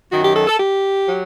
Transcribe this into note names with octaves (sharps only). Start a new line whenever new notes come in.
F#2 D#3 F#3 F#4
G4
A4
A4
G4
F#3